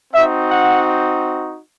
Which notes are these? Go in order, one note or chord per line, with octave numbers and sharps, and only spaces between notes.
C4 D#4 F#4 E5
F#5